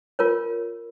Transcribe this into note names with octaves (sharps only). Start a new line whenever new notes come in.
F4 A#4 C#5